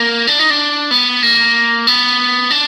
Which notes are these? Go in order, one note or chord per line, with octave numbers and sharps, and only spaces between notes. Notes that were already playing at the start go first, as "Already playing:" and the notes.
Already playing: A#3
D4
D#4
D4
B3
A#3
B3
D4